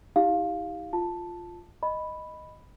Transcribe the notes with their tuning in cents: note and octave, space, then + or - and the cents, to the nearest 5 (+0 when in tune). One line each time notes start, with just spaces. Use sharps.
E4 -45 G4 +0 F5 +5
F4 +0 A5 +0
D#5 +0 B5 +0